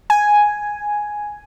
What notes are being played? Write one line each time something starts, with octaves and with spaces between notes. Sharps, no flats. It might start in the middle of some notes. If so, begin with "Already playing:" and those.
G#5